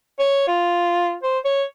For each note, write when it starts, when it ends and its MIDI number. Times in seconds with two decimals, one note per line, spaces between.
0.19 0.45 73
0.48 1.15 65
1.23 1.39 72
1.45 1.64 73